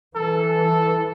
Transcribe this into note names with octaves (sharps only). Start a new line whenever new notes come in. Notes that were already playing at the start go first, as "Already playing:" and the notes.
E3 A4